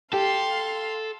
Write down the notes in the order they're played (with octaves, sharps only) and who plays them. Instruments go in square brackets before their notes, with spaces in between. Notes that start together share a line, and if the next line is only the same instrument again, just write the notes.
[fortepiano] G4 [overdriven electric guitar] A4 [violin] F5 C6